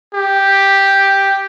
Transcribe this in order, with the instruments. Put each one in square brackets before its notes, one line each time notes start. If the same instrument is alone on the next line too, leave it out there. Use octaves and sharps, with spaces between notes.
[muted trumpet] G4